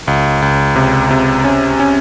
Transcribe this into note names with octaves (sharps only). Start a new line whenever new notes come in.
C#2
C#2
C3
C3
C#4
C#4